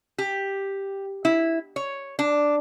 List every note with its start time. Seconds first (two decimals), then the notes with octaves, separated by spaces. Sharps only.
0.18 G4
1.25 E4
1.76 C#5
2.19 D4